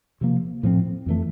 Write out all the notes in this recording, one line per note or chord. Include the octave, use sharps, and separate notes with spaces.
C3 F3 A#3
A2 F3 C4
F2 E3 A3